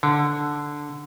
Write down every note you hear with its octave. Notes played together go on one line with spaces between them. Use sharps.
D3